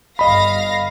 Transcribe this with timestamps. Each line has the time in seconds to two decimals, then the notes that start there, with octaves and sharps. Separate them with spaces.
0.19 G1 D#5 F5 B5 A#6